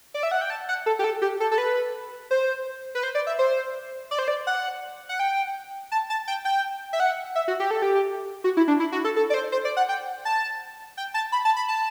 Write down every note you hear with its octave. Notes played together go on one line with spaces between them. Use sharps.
D5
E5
F#5
G5
A5
F#5
A4
G4
A4
G4
A4
A4
B4
C5
B4
C5
D5
E5
C5
D5
C5
D5
F#5
F#5
G5
A5
A5
G5
G5
E5
F#5
E5
F#4
G4
A4
G4
F#4
E4
D4
E4
F#4
A4
A4
D5
C5
C5
D5
F#5
G5
A5
G5
A5
B5
A5
B5
A5